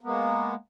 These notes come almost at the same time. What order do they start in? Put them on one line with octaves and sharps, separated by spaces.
A#3 B3 G#3